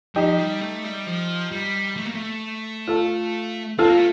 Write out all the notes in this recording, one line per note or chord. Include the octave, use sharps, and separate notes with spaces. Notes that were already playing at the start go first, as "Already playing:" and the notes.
F3 D#4 G4
G3
A3
G3
F3
G3
A3
A#3
A3
F4 A4
C4 F4 A4
A#3
A3